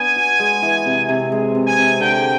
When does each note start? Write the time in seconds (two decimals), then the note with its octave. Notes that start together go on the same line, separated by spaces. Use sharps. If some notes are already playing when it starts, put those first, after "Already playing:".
Already playing: B3 D4 G#5
0.16 F#4
0.39 G#3
0.62 E3
0.86 C3
1.09 C3
1.32 G#3
1.55 C3
1.67 G#5
1.77 C3
2.00 D3 G5